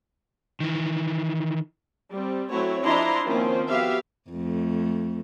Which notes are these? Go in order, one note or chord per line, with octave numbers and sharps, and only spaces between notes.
D#3 E3
G3 C4
F#3 A3 C4 E4 F#4 C#5
F3 D4 E4 D#5 A#5 C6
D#3 F3 A#3 C4 C#4
B3 F#4 G4 E5 F5
F2 A3